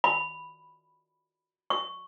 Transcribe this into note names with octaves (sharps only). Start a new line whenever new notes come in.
B5
C#6